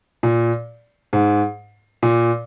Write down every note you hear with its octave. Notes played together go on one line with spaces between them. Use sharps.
A#2
G#2
A#2